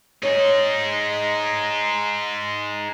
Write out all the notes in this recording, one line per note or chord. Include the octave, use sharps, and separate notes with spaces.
D#4 G#4 C#5